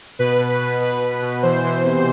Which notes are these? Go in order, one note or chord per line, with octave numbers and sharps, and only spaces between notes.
B2 B4
B2
B2
B2 B4
B2
B2
E3 C5
E3
C3